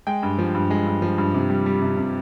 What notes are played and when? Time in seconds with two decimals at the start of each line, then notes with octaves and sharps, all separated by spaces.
0.07 G#3 G5
0.23 G2
0.39 F3
0.54 G2
0.70 G#3
0.86 G2
1.02 F3
1.18 G2
1.34 C3
1.50 G3
1.66 G3
1.82 C3
1.98 C3